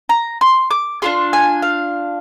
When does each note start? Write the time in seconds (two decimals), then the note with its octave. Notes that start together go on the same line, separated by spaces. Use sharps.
0.09 A#5
0.41 C6
0.71 D6
1.02 D4 F4 G#4 C6
1.33 G#5
1.62 F5